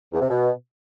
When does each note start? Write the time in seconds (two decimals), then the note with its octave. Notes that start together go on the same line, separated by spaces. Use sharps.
0.12 E2
0.21 C3
0.29 B2